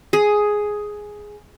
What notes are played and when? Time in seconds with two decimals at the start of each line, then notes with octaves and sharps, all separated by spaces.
0.13 G#4